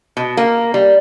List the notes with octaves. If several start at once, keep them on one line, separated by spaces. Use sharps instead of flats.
B2
A#3
G3